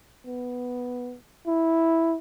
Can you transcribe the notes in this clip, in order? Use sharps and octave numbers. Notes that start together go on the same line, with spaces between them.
B3
E4